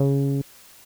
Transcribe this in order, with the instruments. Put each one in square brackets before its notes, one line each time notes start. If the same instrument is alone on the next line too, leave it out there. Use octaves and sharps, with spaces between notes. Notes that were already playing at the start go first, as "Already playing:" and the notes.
Already playing: [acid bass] C#3